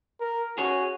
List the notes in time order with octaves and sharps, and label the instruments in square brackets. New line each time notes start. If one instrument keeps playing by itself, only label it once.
[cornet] A#4
[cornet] F#4 [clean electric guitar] G#4 C#5